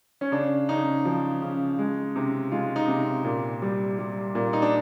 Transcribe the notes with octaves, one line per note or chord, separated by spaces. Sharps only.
C#4
C#3 D4
C#3 D#4
F3
C#3
G#3
C3
G#3 F4
D#4
C3
A#2
G3
G3
A#2
D#4
D4